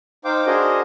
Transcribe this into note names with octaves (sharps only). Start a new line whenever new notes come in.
D#4 C5 F5 G5 D6
D4 F#4 G#4 A#4 C5 D#5